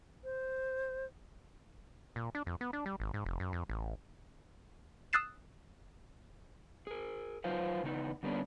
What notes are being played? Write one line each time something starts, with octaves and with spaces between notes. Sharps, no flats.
C5
A#2
D4
F2
B3
D4
G3
G#1
G#2
F1
F#2
F2
A1
D#6 E6 F#6 A6 C7 E7
G#4 A#4
F#3 D#4 F4 B4 C5 F5
C#3 E3 B3 D#4
D3 G3 A#3 B3 C#4 D4